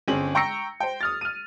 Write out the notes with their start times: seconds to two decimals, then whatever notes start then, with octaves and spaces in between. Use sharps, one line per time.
0.08 G1 C4 C#4 G#4 F#7
0.35 G5 A#5 C#6 E6 A#6 C#7
0.80 C5 G5
1.01 D#6 F6 A6
1.21 F6 D#7